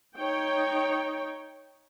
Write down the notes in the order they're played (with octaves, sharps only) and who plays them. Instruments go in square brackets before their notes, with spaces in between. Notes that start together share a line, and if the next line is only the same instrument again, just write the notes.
[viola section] D#4 C#5 G5